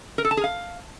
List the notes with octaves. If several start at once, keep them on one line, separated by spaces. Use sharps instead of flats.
A#4
A4
A5
G#4
F5